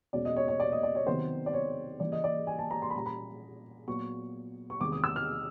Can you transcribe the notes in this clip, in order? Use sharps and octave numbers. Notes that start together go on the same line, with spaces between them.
E2 B2 G#3 C#4 D5
D#5
C#5
C#5
D5
D#5
D5
C#5
C3 D#3 F#3 B3 C5
D5
C#5
C#3 E3 G3 A#3 D5
D#5
D5
G#5
A5
A#5
C6
B5
A#2 G3 A#3 C#4 A#5
B5
A#2 F#3 B3 C#6
C#6
E2 C3 D#3 G#3 D6
D#6
E6
F6